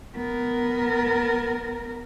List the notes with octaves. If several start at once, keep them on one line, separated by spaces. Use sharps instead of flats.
B3 A#4